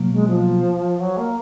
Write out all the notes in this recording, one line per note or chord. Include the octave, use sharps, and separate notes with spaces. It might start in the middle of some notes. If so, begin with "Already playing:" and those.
Already playing: B2 F#3 A#3
G#3
F3
F#3
A#3